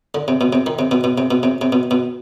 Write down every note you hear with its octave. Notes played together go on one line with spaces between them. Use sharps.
D3
C3
B2
C3
D#3
C3
B2
B2
C3
B2
C3
C3
B2
B2